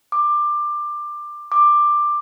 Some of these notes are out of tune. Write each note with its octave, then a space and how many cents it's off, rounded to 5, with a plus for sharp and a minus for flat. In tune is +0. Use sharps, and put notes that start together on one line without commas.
D6 +20
D6 +15